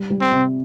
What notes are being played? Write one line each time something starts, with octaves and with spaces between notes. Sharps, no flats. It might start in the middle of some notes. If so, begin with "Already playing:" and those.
Already playing: G3
G3
C4
C3